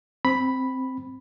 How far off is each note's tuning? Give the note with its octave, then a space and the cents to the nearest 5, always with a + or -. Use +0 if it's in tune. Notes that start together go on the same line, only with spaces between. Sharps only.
C4 +0 B5 +0